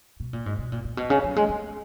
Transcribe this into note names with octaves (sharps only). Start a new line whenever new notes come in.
B2
A#2
G#2
B2
A#2
A#2
B2
C#3
F#3
G#3
C#4